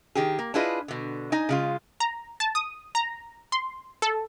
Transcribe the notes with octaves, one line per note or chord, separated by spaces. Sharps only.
D#3 G4 G#4
A#3
D4 E4 F4 G#4 B4 D#5
B2 D3
D#4 D#5 G#5
C#3 G#3 F4
A#5
A5
D#6
A#5
C6
A4